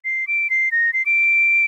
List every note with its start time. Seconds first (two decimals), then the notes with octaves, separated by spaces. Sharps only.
0.05 C7
0.28 D7
0.50 C7
0.72 A#6
0.93 C7
1.06 D7